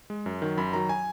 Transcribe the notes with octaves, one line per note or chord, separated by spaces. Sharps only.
G#3
F#2
D#3 F#3
F#2 B5
D#3 F#3 A#5
G#5